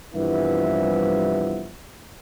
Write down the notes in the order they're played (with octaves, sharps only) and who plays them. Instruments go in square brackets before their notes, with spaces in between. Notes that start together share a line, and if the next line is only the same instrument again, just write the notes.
[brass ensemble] C2 G2 E3 F3 B3 E5